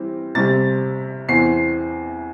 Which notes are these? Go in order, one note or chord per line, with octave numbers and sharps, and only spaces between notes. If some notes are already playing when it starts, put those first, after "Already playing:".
Already playing: E3 G3 C4
C3 G3 C4 A6
E2 E3 C4 C7